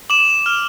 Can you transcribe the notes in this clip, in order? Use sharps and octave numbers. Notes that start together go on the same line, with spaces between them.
D6 E7 F#7
F6